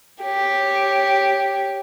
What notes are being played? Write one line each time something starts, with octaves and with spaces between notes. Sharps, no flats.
G4 C#5